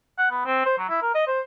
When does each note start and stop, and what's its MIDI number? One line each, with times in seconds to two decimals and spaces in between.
0.18 0.29 78
0.31 0.42 59
0.46 0.63 60
0.66 0.75 72
0.78 0.86 54
0.89 1.00 64
1.02 1.13 70
1.15 1.26 75
1.27 1.41 72